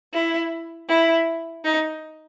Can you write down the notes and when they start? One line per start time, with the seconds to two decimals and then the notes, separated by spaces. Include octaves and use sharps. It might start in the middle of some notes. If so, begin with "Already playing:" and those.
0.14 E4
0.89 E4
1.64 D#4